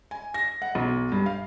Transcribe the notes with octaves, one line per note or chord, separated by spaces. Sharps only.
G#5
A#6
F#5
B1
G2
F5